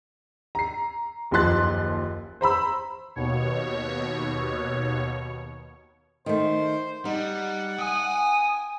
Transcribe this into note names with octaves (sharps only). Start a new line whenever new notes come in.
A#5 C7
F#1 D#2 F3 C6 F#6 A6
C5 A#5 B5 E6
D#2 B2 C#5
D#3 A3 C5
G3 D#4 F#5
G5 G#5 D#6